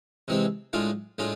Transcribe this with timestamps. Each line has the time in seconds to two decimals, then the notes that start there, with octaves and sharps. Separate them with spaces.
0.28 C3 E3 G#3 C4
0.73 A2 G#3 D4 F4
1.18 A2 G#3 D4 F4